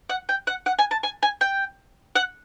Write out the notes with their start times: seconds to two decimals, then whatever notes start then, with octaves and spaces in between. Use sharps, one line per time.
0.10 F#5
0.29 G5
0.47 F#5
0.66 F#5
0.79 G#5
0.91 A5
1.03 G#5
1.23 G#5
1.41 G5
2.16 F#5